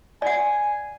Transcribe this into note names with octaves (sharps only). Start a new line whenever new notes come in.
D5 F#5 G#5